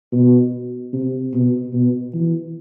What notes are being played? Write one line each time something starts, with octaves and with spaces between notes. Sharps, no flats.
B2
C3
B2
B2
E3